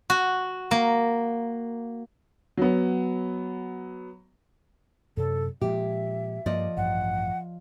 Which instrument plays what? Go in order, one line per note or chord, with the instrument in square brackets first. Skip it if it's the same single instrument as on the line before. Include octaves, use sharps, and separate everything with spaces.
[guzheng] F#4
A#3
[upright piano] F#3 B3
[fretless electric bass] F#2 C3 [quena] A4
[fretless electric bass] A#2 F3 G#3 [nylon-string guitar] G4 [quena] E5
[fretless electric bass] G2 A#3 [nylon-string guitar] F3 D5 D#5
[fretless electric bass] A1 G2 [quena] F#5